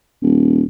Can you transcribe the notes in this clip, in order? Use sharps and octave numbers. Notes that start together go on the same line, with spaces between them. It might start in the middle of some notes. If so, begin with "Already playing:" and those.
D#1